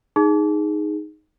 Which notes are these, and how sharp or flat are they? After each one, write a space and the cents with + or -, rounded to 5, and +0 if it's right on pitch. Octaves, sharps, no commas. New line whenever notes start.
D#4 +0 G#4 +0